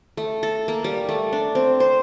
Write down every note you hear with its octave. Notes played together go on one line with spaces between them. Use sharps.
A3
A4
A#3
G3
A3
D4
C4
C5